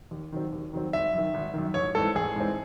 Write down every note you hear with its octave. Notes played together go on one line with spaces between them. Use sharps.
D#2
D#3 F#3 C4
D#2
D#3 F#3 C4
G#1 E5
F#2 D#3
G#1
F#2 D#3
A1 C#5
G#2 E3 C4 A4
A1 G#4
G#2 E3 C4